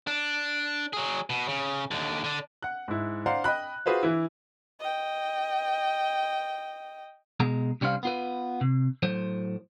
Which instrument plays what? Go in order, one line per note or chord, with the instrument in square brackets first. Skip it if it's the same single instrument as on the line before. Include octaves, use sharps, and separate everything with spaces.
[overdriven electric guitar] D4
F#3 G#4
B2
C#3
D#2 D3
D3 D4
[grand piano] F#5 F#6
G#2 E4
C5 D5 F5 F#5 A#5 C6
D#5 G5 B5 F#6
F4 F#4 G#4 B4 C5 F5
E3 E4
[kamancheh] D#5 G5
[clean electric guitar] B2 G#3 A#5
C2 G3 C#4 C5 F5
B3 F4 B4
C3
A2 F#3 C5